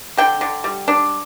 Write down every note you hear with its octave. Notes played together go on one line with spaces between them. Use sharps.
D3 G5
D3
G3
D4